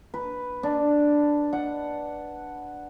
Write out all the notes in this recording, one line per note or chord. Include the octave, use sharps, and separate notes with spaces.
B4
D4
F#5